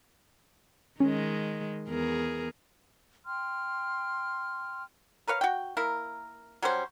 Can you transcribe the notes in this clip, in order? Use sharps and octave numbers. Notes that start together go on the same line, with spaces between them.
D#3 G#3 C#4
E2 G#4 A#4
G5 C6 F6
A#4 B4 C#5 F5
F#4 G5
A#3 E4 A#4
F#3 G3 C#4 C5